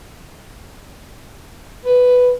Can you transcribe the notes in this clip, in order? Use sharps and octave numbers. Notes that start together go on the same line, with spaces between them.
B4